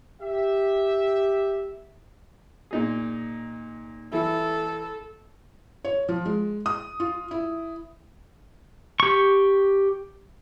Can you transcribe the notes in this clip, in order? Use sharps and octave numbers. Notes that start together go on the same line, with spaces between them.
G4 E5
A#2 D#4 G#4
E3 E4 A4
C#5
F3
G#3
D#6
F4
E4
G4 C#6